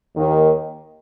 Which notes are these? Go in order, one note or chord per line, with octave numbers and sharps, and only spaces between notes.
D#2 D#3